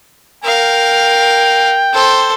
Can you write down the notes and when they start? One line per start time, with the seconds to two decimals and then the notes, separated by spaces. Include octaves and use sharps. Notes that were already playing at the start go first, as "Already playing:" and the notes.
0.44 A#4 F5 G5
1.93 A4 C5